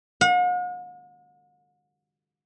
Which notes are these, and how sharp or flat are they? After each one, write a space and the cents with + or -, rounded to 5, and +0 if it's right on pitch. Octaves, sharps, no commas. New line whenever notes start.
F#5 -45